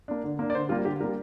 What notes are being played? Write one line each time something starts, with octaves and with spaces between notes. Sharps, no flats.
A#3 D4
D3
A#3 D4
D5
D3 C5
G3 A#3 F4
D3 G4
G3 A#3 A#4